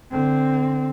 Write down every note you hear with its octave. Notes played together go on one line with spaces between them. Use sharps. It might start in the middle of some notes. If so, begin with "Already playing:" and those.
D3 C4